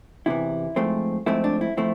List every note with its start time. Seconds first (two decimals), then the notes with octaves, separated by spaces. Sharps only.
0.26 E2 C3 E3 E4
0.76 G#2 F3 A3 C4
1.26 G#2 F3 A3 C4 E4
1.44 D4
1.61 E4
1.77 F3 A3 C4 E4